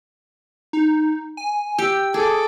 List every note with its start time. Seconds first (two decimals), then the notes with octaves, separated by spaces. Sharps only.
0.73 D#4
1.37 G#5
1.78 G4 E6
2.14 G#4 A4 D6